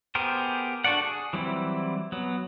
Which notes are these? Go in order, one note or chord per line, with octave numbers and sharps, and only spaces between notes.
B3 G4 G#4 A#4 C5
D4 F#4 A4 D5 F#5
G#4
E3 F#3 G3 C4 E4
F#3 B3